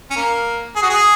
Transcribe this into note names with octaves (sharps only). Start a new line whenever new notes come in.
C#4
A#3
G#4
F#4
G#4